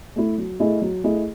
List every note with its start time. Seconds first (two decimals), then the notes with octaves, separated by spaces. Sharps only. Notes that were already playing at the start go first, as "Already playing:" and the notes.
0.16 A3 E4
0.38 F#3
0.59 A3 E4 G#4 D#5
0.82 F#3
1.03 A3 E4 G#4 D#5